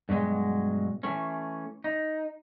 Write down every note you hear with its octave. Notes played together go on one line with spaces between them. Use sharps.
G2 B2 F#3 G#3
E3 A3 C#4
D#4